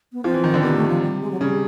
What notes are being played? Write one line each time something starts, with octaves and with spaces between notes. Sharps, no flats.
B3
F3 C4
E3
D#3
D3
C3 B3
A3
F3
G3
G#3
F#3
C#3 G3